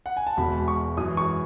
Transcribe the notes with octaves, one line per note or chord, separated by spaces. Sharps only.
F#5
G#5
A5
E1 E2 B2 G#3 B5
C#6
F#2 E3 G#3 D#6
C#6